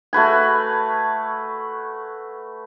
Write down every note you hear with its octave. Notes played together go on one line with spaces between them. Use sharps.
A3 F#4 B4 G#5